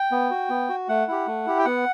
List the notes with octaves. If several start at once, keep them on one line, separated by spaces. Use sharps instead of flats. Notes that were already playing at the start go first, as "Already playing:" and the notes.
Already playing: G5
B3
F#4
B3
F#4
A3 F#5
E4 G4
A3
E4 G4
G5
B3 F#5